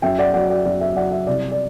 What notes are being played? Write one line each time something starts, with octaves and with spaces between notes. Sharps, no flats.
F#2 E5 G5
D5 F#5
F#3 D5 F#5
D5 F#5
F#2 D5
E5
F#3 D5 F#5
E5
C2 D5
D5